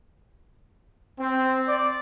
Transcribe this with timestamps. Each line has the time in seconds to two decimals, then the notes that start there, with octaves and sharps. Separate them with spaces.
1.20 C4
1.68 D5